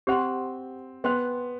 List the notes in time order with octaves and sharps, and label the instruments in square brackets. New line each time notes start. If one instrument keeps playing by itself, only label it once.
[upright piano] C4 [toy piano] G4 C5 F#5 C6
[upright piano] B3 [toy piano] C5 G5 C6